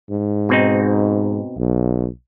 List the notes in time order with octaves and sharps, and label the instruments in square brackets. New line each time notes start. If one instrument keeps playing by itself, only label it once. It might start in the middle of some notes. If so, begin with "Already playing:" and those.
[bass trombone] G#2
[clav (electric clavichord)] B2 C4 D#4
[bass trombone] B1